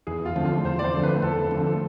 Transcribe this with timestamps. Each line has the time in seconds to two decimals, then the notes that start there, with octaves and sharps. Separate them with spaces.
0.07 E2 G#4
0.25 F4
0.36 D3 F3 A3 C4
0.45 F4
0.65 E2 C5
0.79 D5
0.84 C5
0.93 D3 F3 A3 C4
1.03 B4
1.16 B4
1.22 E2 A4
1.51 D3 F3 A3 C4